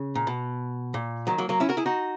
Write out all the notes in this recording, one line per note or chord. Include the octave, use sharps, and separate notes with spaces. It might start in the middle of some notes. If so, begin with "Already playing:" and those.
Already playing: C#3
A#2
B2
A#2
D#3 F#3
F#3 A#3
F#3 A#3
C#4 E4
F#4 A#4
E4 G#4
D#4 F#4